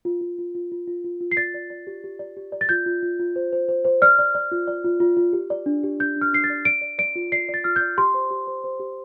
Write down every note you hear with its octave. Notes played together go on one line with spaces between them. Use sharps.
F4
F4
F4
F4
F4
F4
F4
F4
C7
D5 A6
D5
D5
G4
G4
D5
G4
D5
A6
F4 G6
F4
F4
F4
C5
C5
C5
C5
D5 F6
D5
D5
F4
D5
F4
F4
F4
G4
D5
D4
G4
D4 G6
D4
F6
D4 C7
A6
D5
D5 D7
D5
D5 D7
F4
D5 C7
D5
A6
F4 F6
D5 G6
G4 C6
C5
G4
C5
C5
G4